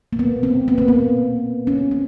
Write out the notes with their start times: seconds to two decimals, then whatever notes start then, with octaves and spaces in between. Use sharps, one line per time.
0.13 A#3
0.19 B3
0.43 C4
0.68 B3
0.78 A#3
0.88 B3
1.67 C#4
1.91 C4